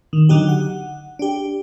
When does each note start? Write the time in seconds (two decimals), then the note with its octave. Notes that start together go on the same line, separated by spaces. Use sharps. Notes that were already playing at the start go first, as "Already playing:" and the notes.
0.13 D#3
0.29 D3 F#3 D#4 G4
0.49 F#5
1.19 D4 G4